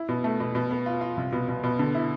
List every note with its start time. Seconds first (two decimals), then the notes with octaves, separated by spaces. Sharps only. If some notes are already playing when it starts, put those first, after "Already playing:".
Already playing: E4
0.09 B2
0.24 A3
0.40 B2
0.55 B2
0.71 B3
0.86 F4
1.01 F4
1.17 C2
1.32 B2
1.48 B2
1.64 B2
1.79 D3
1.95 E4